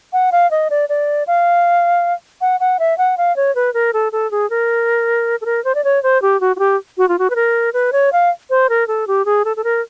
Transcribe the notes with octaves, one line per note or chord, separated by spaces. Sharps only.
F#5
F5
D#5
D5
D5
F5
F#5
F#5
E5
F#5
F5
C#5
B4
A#4
A4
A4
G#4
A#4
A4
A#4
C5
D5
C#5
C5
G4
F#4
F#4
G4
F#4
F4
F#4
B4
A#4
B4
C#5
F5
C5
A#4
A4
G4
G#4
A4
A4
A#4